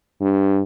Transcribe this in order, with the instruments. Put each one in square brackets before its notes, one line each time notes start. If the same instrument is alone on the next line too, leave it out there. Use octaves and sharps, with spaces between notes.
[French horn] G2